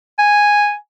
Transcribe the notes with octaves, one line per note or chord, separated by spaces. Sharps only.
G#5